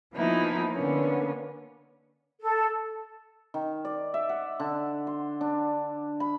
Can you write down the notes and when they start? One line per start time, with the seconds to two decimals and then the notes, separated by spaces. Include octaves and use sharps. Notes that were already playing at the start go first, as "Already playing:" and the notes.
0.15 E3 F3 A#3 B3 D#4 E4
0.74 D3 A#3 B3 C#4
2.40 A4
3.54 D#3
3.85 D5
4.14 E5
4.29 F#5
4.60 D3
5.07 C6
5.41 D4
6.20 B5